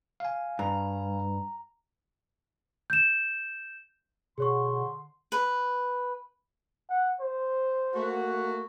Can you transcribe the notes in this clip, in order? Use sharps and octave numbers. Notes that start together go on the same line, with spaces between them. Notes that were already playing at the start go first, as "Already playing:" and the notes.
F5 G#5
G2 A#5
G6 E7
B2 D3 G#4 C#5 C6 C#6
B4
F#5
C5
A3 A#3 F#4